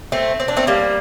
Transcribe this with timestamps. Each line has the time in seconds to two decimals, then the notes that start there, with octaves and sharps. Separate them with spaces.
0.12 A3 C4
0.40 C4
0.48 D4
0.57 A3 C4
0.67 G3 A#3